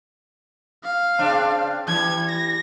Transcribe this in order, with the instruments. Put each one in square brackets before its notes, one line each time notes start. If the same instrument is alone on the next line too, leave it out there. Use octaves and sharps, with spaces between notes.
[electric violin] F5
[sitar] C#3 C4 D4
[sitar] E3 G3 [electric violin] G#6
[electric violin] A#6